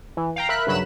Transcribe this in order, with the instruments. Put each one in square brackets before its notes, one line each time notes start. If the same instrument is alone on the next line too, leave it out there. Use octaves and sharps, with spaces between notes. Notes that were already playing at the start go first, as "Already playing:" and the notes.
[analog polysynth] E3
F5 G5 A#5
A#4 E5 B5 F#6
G2 C#3 F#3 B5 F#6 E7